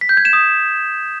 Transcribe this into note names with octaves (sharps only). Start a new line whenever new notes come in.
B6
G6
G#6
E7
D#6